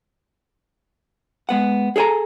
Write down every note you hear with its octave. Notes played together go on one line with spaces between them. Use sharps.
G#3 B3 F#5
G#4 A4 C#5 G#5 A#5